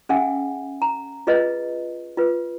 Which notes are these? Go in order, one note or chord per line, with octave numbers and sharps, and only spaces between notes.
C#4 G#4 E5 F#5 G#5
A#5
F4 G#4 B4 D#5
F4 B4